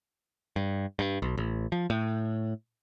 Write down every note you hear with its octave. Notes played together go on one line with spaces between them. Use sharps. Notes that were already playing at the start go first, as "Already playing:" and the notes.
G2
G2
B1
A1
F3
A2